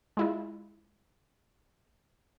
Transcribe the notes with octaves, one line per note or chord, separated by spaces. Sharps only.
G#3 E4 F4